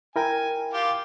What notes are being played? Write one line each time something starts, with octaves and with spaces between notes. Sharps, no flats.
E4 A#4 G5 G#5
F4 G4